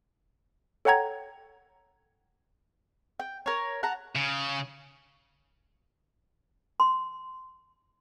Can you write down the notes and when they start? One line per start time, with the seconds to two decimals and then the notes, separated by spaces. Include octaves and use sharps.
0.85 A4 C#5 F#5 G5 A#5 G#6
3.20 G5
3.46 A#4 C#5
3.83 F#5 A5 A#5
4.15 C#3
6.80 C6